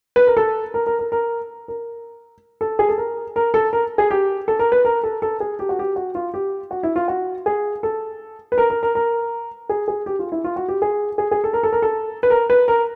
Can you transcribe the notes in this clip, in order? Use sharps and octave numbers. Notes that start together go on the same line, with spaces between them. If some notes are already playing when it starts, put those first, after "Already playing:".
B4
A#4
A4
A#4
A#4
A#4
A#4
A#4
A4
G#4
A4
A#4
A#4
A4
A#4
G#4
G4
A4
A#4
B4
A#4
A4
A4
G#4
G4
F#4
G4
F#4
F4
G4
F#4
E4
F4
F#4
G#4
A4
B4
A#4
A#4
A#4
A#4
G#4
G#4
G4
F4
E4
F4
F#4
G4
G#4
G#4
G#4
A4
A#4
A4
A#4
A4
B4
A#4
B4
A#4